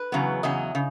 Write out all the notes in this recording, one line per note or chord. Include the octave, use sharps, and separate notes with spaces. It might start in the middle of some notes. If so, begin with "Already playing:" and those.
Already playing: B4
E2 C#3 F#3 B3
E2 C#3 F#3 D#5
C#3